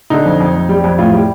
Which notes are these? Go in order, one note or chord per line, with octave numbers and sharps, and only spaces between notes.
D3 D#4
F2
F2
F2
G3
F2
A2 F4
G3